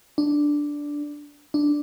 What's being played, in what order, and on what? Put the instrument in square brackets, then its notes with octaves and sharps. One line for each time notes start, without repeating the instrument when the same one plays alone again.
[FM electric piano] D4
D4